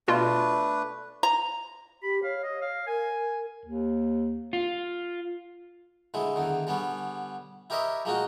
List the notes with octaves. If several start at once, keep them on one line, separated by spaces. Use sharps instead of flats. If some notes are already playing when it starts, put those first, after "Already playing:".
B2 A3 D4 F4 B4
A#5
G4 B5
C#5 F5
D#5
F5
A#4 G#5
D#2
F4
A1 D3 G#3 E4
E2 D3 D#3
D3 G3 B3 C#4
E4 G4 A#4 C#5 D#5 E5
F3 G#3 A#3 D#4 F4 F#4